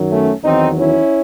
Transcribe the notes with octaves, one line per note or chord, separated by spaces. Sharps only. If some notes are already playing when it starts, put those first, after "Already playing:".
Already playing: F#2 D#3 F#3
A3 C#4
E2 D#3 F#3 C4 D#4
C#4 E4